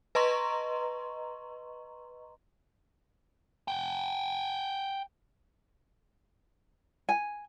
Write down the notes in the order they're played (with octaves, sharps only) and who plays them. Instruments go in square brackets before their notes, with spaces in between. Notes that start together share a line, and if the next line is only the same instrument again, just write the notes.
[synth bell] B4 D#5 A#5 C6 C#6
[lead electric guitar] F#5 G5
[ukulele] G#5